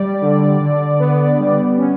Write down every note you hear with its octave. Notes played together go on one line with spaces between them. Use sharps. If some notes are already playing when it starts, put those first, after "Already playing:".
Already playing: G3 D5
D3
D3
B3
G3
C#4